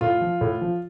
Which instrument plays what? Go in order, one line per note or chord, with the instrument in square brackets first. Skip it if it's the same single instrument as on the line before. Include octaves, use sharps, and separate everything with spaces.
[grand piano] A2 F4
F3
A2
F3